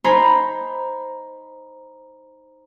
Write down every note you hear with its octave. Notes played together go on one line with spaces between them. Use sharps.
D#4 C5 G#5 A#5 B5